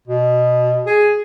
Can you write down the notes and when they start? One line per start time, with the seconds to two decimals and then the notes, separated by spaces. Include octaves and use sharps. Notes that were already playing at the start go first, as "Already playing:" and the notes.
0.08 B2
0.86 G#4